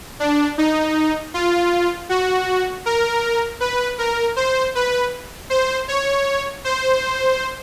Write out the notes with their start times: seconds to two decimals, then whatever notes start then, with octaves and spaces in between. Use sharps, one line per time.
0.20 D4
0.58 D#4
1.34 F4
2.09 F#4
2.86 A#4
3.60 B4
3.98 A#4
4.36 C5
4.75 B4
5.50 C5
5.88 C#5
6.64 C5